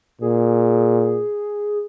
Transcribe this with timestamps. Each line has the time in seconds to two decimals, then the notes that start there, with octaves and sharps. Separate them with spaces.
0.21 A#2 G#4